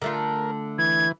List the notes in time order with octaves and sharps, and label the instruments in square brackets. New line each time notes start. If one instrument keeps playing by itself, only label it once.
[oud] D3 A3 F4 [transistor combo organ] A#4
[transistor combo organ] E3 [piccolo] G#6